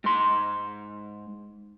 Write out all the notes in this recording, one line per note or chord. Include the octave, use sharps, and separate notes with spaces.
G#2 C6